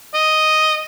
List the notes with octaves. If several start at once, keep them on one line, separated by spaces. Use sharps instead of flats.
D#5